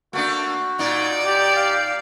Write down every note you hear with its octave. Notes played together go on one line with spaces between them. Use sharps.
A3 A#3 D4 F#4
A#2 D#4 D5
G4
F5